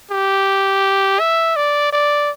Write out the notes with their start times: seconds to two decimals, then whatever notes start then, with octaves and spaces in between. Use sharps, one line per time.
0.11 G4
1.20 E5
1.56 D5
1.92 D5